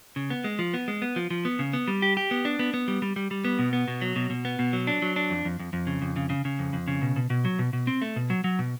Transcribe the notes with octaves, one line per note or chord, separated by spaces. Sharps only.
C#3
B3
G#3
F3
B3
G#3
B3
F3
F3
B3
C#3
B3
G3
G4
G4
B3
D4
B3
B3
G3
G3
G3
G3
B3
B2
B3
B2
F#3
B2
B2
B3
B2
F#3
D4
F#3
D4
F2
F2
F2
F2
C#3
F2
C#3
C#3
C#3
F2
F2
C#3
B2
B2
B2
F#3
B2
B2
C4
A3
B2
F#3
F#3
B2